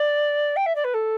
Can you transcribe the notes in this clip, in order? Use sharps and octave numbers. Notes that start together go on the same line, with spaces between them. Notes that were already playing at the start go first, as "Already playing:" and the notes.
Already playing: D5
G5
E5
D5
B4
A4